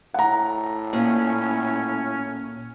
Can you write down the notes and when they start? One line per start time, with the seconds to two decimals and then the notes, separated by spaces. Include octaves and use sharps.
0.14 A2 F#5 A#5
0.93 A#2 C#4